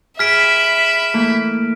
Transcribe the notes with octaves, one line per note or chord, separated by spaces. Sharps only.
G#4 E5 B5 F6 B6 D7
E3 A3 A#3